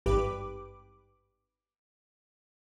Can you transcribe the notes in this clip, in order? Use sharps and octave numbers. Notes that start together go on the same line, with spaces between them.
G#1 G2 G4 B4 D6